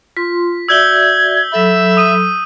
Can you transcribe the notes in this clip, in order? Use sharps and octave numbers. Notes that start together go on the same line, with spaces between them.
F4 C6 B6
F#4 D5 E5 E6 G6 G#6 G7
F#3 A4 E5 B5
D#6 D#7